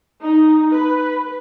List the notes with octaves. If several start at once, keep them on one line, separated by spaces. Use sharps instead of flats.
D#4
B4